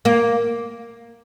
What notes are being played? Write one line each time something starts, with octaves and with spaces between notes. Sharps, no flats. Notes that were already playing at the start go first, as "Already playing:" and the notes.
A#3